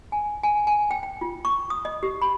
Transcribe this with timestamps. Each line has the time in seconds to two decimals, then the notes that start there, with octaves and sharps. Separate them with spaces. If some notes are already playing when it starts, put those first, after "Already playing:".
0.12 G#5
0.43 G#5
0.67 G#5
0.91 G5
1.03 G5
1.21 F4
1.45 C#6
1.70 D#6
1.85 D#5
2.03 G4
2.21 B5